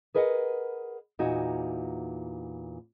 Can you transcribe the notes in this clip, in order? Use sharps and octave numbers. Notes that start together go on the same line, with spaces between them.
G#4 A#4 B4 D#5 E5 F#5
E2 A#2 D#4 E4 F#4